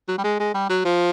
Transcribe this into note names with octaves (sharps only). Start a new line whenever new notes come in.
F#3
G3
G#3
G#3
G3
F#3
F3